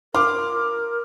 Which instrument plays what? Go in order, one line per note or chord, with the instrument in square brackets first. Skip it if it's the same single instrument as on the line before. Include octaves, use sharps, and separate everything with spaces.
[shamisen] F4 [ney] A#4 [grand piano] D6 F6